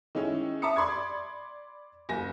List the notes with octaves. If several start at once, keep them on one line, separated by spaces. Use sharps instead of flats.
D#3 G#3 C#4 E4
E5 A5 A#5 D6 D#6 C#7
D5 B5 C6 D6 G#6
F#1 G#5 A#6